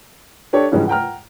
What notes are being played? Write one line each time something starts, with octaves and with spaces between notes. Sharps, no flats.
D4 G4 A4 C#5 D5
G#2 C#3 E3 F3 G3 G#3
F#5 G5 A#5 F6